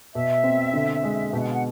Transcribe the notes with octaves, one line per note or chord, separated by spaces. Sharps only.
B2 E5
C4
D3
G#3
B2 G5
F#5
F5
F#5